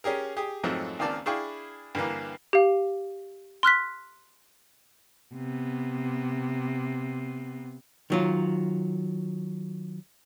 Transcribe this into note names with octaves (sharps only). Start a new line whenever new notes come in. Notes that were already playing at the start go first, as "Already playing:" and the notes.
C#4 G4 G#4 A#4
G4 G#4 D#6
F2 G#2 F3 F#3 A3 C4
C#2 D#3 A#3 C4 D5 A5
D4 E4 G#4 F5 G5 C#6
G2 D3 E3 A#3
G4 F5
C6 F6 F#6 B6
C3 B3
D#3 F#3 F4